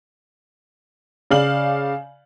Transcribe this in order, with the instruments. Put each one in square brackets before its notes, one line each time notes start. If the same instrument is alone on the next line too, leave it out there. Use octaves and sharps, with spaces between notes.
[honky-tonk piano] C#3 D5 F5 F#7